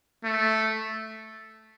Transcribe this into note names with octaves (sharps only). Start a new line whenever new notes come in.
A3